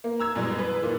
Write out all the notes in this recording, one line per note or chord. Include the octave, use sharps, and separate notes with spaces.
A#3
A#5 E6 G#6
F#2 B2 E3 G3 G#3
B4
D#2 A#2 E3